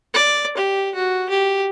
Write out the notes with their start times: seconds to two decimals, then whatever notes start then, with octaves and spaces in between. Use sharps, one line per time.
0.14 D5
0.57 G4
0.95 F#4
1.30 G4